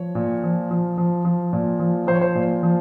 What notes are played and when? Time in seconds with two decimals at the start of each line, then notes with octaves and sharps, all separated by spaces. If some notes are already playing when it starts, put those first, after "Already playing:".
Already playing: F3 C#5
0.15 A#2
0.44 F3
0.71 F3
0.98 F3
1.25 F3
1.53 A#2
1.79 F3
2.07 F3 C5
2.14 C#5
2.21 C5
2.35 A#2
2.63 F3